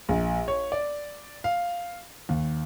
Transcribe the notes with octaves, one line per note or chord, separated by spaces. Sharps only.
A#1
C#5
D5
F5
D#2